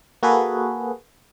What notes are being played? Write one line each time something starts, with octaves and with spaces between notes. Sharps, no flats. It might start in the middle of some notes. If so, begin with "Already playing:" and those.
A#3 F#4 G#4 A4 B4